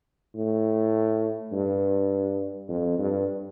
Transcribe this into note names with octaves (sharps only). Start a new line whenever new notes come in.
A2
G2
F2
G2